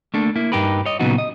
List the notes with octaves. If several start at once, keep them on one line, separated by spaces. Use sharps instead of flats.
A3 A#3 D4 A4
A#3 E4
G2 B2 D#4 G4 A#4 B4
C#5 D#5
A#2 C#3 F#3 B3 D#4 F#4
D#5